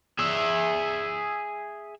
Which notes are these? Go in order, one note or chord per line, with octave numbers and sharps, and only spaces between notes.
G#4 E5